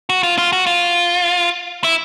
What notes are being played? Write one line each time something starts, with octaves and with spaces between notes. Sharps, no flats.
F#4
F4
F4
F#4
F4
E4